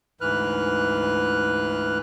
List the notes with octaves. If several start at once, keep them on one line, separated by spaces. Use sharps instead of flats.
D2 G#2 E3 B4 F6 F#6